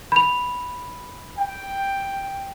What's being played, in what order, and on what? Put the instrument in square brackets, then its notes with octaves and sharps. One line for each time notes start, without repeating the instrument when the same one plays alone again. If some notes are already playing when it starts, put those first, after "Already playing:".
[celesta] B5 F7
[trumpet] G5